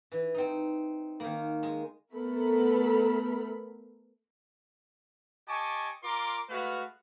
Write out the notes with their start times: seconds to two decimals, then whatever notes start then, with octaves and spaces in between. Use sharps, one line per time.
0.12 E3
0.34 C4 D#4
1.20 D#3 A#3
1.63 G#3
2.13 A3 B3 A4 A#4 B5
5.48 G4 D#5 G#5 A5 C#6 D6
6.03 F4 A#4 A#5 C6 D6
6.49 G#3 A3 F#4 B4 F5